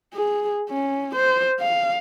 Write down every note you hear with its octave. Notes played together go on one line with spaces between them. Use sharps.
G#4
C#4
C5
F5